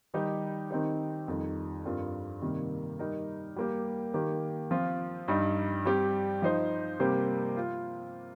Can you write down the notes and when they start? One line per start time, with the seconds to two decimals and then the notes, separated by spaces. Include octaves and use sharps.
0.14 D#3 G3 D#4 G4
0.71 D#3 C4 D#4 G4
1.28 F2 D#3 G3 D#4
1.85 G2 G3 C4 F4 A#4
2.42 C3 D#3 G3 A#3
2.99 G3 D#4 A#4
3.56 G3 A#3 G4
4.14 D#3 A#3 G4
4.71 F3 C4 F4
5.28 G2 G3 D#4
5.86 G3 C4 G4
6.42 F3 D#4 C5
7.00 C3 G3 A#3 G4 C5
7.57 F4